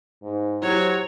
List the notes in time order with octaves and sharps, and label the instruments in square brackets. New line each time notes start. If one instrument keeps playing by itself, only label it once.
[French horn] G#2
[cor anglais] F#3 [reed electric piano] E4 G4 [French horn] C5 [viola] C#5